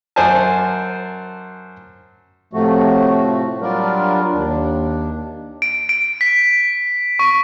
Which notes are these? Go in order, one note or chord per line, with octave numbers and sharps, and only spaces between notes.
F#2 C5 G#5 A5
A2 C3 F3 A3 F#4
F#3 G3 D4 F4 A#4 D5
D#2 D4
D7
D7
B6
C#6